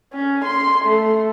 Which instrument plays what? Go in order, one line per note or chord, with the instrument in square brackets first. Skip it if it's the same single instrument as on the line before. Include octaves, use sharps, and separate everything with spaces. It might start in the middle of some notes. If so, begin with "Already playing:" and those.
[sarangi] C#4
C6
A3